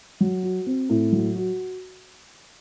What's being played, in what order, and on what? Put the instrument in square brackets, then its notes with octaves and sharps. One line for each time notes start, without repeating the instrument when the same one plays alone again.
[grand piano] F#3
F#4
C4
A2
F#3
F#4